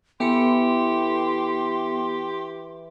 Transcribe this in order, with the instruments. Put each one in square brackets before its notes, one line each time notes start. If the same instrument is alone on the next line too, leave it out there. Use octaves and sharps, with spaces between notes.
[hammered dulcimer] E3 [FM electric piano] B3 A4 C#7 [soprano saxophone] G4 [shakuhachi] C6